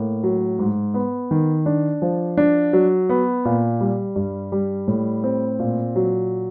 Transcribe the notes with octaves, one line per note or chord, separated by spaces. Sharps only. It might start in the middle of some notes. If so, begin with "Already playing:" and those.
Already playing: A2 A#3
F#3
G#2
B3
D#3
D4
F3
D4
F#3
B3
A#2
G3
G2
G3
A2
C4
A#2
F#3